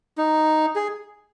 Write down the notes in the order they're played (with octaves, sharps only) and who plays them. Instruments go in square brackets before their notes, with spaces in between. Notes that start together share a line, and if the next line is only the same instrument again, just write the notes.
[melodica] D#4
G#4